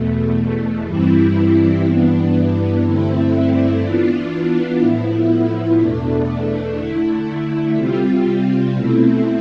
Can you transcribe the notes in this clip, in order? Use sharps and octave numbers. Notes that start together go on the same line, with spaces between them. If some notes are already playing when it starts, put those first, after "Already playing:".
Already playing: E2 B2 A3
G2 E3 G3 C4 E4
G2 E3 B3 D4
G2 D3 A3 C4 E4
E3 B3 D4 F4
A2 F3 B3 E4
E2 B2 A3 D4
D3 A3 E4
C3 G3 C4 F4
B2 A3 C4 E4